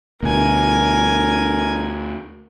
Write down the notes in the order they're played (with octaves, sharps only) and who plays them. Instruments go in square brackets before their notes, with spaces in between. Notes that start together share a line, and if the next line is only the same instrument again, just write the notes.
[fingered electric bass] D2 B2 [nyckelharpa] A#4 G#5